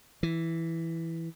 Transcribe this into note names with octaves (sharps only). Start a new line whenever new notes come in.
E3